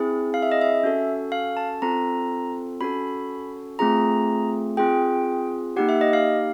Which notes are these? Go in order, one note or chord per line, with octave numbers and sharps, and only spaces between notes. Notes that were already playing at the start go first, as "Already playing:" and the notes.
Already playing: C4 E4 G#4
F5
E5
D#5
E5
C#4 F#4 A4
F5
A5
C4 F4 A4 A#5
C#4 F#4 A4 B5
A3 C4 F4 G#4 A#5
C4 F4 G#4 G5
A#3 D#4 G4 F#5
E5
D#5
F5